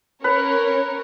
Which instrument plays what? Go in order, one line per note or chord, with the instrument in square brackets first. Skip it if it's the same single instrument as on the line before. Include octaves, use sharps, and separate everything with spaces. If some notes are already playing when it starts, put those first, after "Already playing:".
[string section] C#4 A#4 C#5 [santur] B4